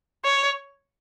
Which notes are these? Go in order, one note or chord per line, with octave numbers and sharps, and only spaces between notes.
C#5